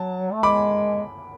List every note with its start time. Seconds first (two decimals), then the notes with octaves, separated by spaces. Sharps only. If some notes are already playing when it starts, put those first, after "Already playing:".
Already playing: F#3 A5
0.32 A3
0.43 G#3 B5 D6